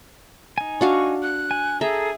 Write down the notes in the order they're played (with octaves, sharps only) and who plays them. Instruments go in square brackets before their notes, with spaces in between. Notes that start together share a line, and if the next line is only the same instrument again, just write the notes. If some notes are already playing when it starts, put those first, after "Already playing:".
[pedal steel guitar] D#4 G#5
[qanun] D4 F#4 F5 [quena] C#6
[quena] F#6
[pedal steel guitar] G#5
[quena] G#4 [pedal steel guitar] A4 A#5 [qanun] E5